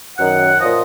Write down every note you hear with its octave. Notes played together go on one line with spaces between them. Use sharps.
F#2 D#3 F#5
A#2 F3 D#5